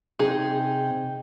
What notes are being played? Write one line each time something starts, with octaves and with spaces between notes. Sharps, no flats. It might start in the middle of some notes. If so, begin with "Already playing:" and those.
C3 D#4 G#4 G5